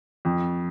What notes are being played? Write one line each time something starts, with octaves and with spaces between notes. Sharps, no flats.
F2